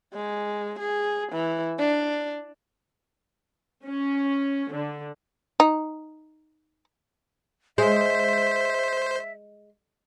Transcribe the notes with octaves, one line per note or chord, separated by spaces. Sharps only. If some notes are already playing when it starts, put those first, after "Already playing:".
G#3
G#4
E3
D4
C#4
D3
D#4
G#3 C5 E5